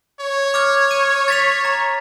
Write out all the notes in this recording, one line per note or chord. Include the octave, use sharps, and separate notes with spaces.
C#5
D6 F6 G#6
D#7
A6 B6 F7
A#5